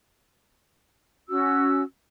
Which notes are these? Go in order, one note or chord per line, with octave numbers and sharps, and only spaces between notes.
C#4 F#4 E6